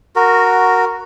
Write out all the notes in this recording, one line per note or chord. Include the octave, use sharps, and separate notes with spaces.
F#4 A#4